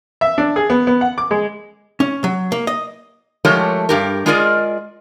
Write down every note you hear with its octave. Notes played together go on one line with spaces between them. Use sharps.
E5
D4
G#4
B3
B3
F#5
D6
G#3
C#4
F#3
A#3
D#5
F3 G#3 A3 G4 A#4 C#5
G2 G4 A#4
G#3 F4 G#4 A#4 D5 D#5